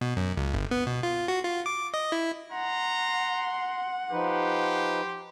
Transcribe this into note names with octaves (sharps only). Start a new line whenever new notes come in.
B2
F#2
C#2
G1
B3
B2
F4
F#4
F4
D6
D#5
E4
F#5 A#5 C6
F3 D#4 G4 B4 C6